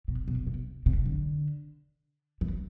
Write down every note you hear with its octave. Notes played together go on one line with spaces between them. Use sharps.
B2
B2
C3
C3
D3
E3